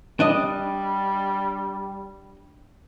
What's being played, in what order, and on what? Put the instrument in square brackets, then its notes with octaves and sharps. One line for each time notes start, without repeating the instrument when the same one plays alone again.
[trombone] G3 [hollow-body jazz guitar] D4 D#5